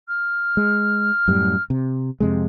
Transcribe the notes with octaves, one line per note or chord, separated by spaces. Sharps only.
F6
G#3
F#2 A2 G3
C3
F2 C3 G#3